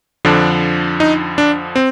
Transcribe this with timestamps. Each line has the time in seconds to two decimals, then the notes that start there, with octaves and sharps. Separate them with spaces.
0.25 F2 D3 F3 D4
1.00 D#4
1.38 D4
1.76 C4